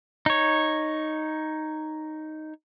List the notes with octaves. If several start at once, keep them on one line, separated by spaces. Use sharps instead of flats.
D#4 C#5